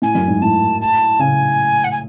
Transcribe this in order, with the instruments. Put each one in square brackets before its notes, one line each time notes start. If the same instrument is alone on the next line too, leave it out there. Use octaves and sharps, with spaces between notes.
[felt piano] A2 [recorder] G#5
[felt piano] F#2
G#2
[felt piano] A2 [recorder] A5
[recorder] A5
[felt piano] C#3 [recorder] G#5
[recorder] F#5
G#5